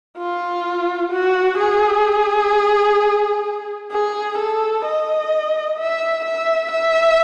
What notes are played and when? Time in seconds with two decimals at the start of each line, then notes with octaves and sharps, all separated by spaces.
0.18 F4
1.12 F#4
1.58 G#4
3.91 G#4
4.38 A4
4.86 D#5
5.78 E5
6.25 E5
6.71 E5